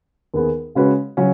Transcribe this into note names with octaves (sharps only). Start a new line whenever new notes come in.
D#2 D#3 B3 G#4
C#3 G#3 C#4 F#4 B4
C#3 F#3 C#4